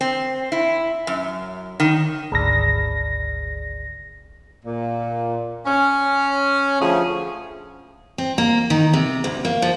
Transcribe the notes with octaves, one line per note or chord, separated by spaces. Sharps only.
C4
E4
F#2
D#3
G#1 D2 A#6
A#2
C#4
D2 F3 A3 G#4
C4
A#3
D#3
C3
D2
A#3
F3